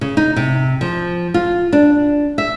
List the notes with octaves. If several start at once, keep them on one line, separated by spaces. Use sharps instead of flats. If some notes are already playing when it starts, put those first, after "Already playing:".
C#3
D#4
C3
F3
F4
D4
E5